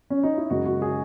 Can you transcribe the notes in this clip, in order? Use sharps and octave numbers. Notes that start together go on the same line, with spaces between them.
C#4
D#4
E4
F#2 C#3 G#3 F#4
F#4
G#4